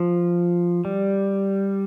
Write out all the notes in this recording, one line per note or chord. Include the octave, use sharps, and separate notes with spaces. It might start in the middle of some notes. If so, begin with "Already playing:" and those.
Already playing: F3
G3